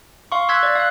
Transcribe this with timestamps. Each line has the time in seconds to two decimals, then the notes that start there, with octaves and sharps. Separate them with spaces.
0.32 F5 C6 C#6
0.49 C6 E6 F#6 G#6 B6
0.63 D5
0.75 F5 F#6